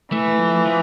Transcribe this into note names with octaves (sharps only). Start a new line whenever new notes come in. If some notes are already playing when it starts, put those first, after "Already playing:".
E3 A3
F3
F3